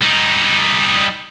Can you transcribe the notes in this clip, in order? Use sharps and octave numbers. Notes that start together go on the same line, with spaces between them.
G3 D#4